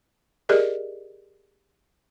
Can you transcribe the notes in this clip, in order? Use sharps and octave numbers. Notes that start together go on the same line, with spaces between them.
G4 G#4 A#4 D5 D#5